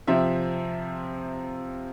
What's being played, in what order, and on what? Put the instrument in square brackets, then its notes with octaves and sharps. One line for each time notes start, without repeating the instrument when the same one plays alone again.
[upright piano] C3 F3 C4 E5